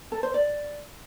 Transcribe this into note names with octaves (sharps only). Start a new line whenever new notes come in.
A4
C5
D5